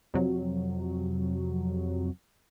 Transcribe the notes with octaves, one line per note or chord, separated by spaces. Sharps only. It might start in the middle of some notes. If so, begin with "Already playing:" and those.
F2 C3 F#3